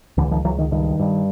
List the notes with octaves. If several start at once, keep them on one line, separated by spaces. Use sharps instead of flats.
C#2 D3 E3
D#3 F3
C#2 E3 F#3
D#3
G2 D#3
G2